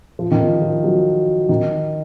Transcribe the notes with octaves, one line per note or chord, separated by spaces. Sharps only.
F3
D#3
F3
F3
F#3
D#3